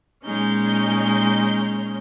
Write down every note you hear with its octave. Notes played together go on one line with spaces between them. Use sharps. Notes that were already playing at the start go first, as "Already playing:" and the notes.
A#2 G#3 C#4 D#4 G6